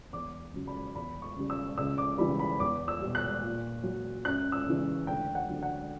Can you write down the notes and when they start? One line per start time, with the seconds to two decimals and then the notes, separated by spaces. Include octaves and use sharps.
0.12 E2 D6
0.54 C#3 F#3
0.67 B5
0.95 E2 B5
1.22 C#6
1.36 C#3 G3
1.50 E6
1.78 C#2 E6
1.98 D6
2.18 C#3 E3 G3 B5
2.39 B5
2.60 E2 D6
2.88 E6
3.01 B2 G3
3.15 F#6
3.42 A#2
3.83 F#3
4.25 F#2 F#6
4.52 E6
4.66 C#3 E3
5.07 D2 G5
5.35 F#5
5.49 D3 F#3
5.63 F#5